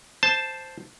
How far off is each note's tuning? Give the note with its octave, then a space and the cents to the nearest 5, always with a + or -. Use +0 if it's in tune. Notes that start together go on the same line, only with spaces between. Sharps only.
C5 +0 A5 +0